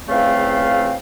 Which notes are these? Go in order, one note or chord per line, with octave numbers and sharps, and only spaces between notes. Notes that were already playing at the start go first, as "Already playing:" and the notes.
E2 C#3 F3 A3 C4 F5